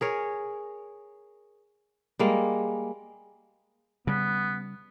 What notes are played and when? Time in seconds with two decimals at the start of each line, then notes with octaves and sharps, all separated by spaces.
0.01 G#4 A#4 C#5
2.19 G3 G#3 A#3
4.07 C#3 G3 B3